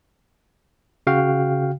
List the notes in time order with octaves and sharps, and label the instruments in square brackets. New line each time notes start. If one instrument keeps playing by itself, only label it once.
[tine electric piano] C#3 F#4 F5 G5